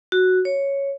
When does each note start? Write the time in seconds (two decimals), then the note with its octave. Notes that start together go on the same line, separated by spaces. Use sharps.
0.12 F#4
0.45 C#5